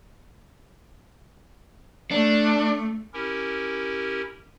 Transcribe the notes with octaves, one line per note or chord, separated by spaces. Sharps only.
A3 D4
C#4 E4 G4 A#4